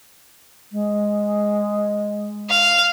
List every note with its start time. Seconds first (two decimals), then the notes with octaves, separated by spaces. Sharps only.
0.71 G#3
2.50 F5